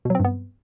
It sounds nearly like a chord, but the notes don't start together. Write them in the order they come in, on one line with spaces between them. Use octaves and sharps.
B2 F#3 C4 G2 B3